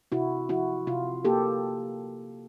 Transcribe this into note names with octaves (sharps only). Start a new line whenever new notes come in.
C3 E4 F#4
F3 E4 F#4
C3 F4
A#3 G4 A4